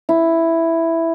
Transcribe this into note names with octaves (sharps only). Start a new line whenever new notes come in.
E4